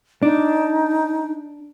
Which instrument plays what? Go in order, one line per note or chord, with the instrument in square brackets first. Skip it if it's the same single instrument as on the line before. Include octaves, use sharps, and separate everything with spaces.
[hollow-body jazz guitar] D4 [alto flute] D#4